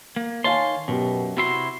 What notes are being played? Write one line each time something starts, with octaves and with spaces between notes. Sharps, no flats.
A#3
D#3 C#5 F5 G#5 A5 C6
F#2 B2 G4
C3 E4 F#4 C6